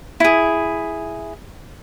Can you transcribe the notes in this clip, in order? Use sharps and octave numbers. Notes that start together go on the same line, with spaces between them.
E4 G#4